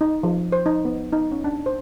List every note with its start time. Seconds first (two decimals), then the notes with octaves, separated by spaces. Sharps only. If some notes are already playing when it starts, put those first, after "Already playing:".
0.01 D#4
0.23 F3
0.52 C5
0.66 D#4
0.85 B3
1.13 D#4
1.32 C#4
1.44 D4
1.66 C5